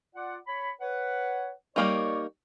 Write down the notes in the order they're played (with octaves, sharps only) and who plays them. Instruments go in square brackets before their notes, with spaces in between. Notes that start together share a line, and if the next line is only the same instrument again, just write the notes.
[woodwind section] F4 D5 F#5
C#5 B5
B4 C#5 F#5
[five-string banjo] G3 A#3 D#4 [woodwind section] C#5 D5 C#6